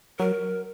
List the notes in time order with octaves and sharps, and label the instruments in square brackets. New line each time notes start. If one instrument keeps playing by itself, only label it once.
[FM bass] F#3 [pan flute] A#4